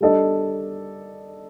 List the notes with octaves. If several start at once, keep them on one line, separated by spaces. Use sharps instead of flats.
G3 D4 A4 D#5